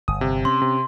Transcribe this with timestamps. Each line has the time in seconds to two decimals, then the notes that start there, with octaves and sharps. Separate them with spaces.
0.08 G1 D#6
0.21 C3
0.45 C4 C#4 C6
0.62 C3